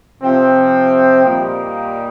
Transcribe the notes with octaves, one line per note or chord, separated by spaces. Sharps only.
C3 F3 C4
A#2 G3 A#3 D#4 G4